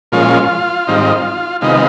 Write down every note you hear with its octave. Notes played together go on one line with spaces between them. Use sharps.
A#2 F3 G#3 C#4 F4
G#2 D#3 G3 C4 D#4
C3 D#3 G#3 B3 D#4 F4